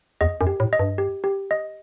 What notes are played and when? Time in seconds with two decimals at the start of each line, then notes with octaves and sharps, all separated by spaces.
0.21 E2 D#5
0.41 F#2
0.47 G4
0.60 A2
0.73 D#5
0.79 G2
0.98 G4
1.24 G4
1.51 D#5